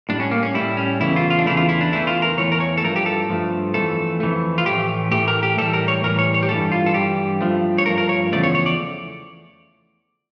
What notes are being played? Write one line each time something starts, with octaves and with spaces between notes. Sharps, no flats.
A2 G3 D4
C#4
A#3
C#4
A2 G3 E4
C#4
E2 C#3 E3 A3 E4
F4
F4
D4
E2 C#3 E3 A3 E4
F4
E4
D4
E2 E3 A3 E4
F4
A#4
E2 E3 A3 C#5
A#4
C#5
A4
G2 F3 A3 A#4
G4
A4
G2 F3 A3
F2 E3 A3 A4
F2 E3 A3
F4
A2 E3 A3 G4
A2 E3 A3 G4
A#4
G4
A2 E3 G3 A4
A#4
C#5
A2 E3 G3 A#4
C#5
C#5
G4
G2 E3 G3 A4
F4
A4
G2 E3 G3 G4
G2 F3 A3
C#5
G2 F3 A3 A#4
A#4
C#5
E2 C#3 F3 A3 D5
C#5
C#5
D5